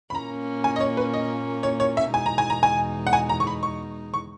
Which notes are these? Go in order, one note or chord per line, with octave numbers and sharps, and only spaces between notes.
B5
A#2 A#3 C#4 A#5
G#5
D#5
C#5
B4
D#5
C#5
C#5
E5
E2 B2 G#3 D#4 G#5
A#5
G#5
A#5
G#5
F#5
G#5
A#5
C#6
B5
C#6
C#6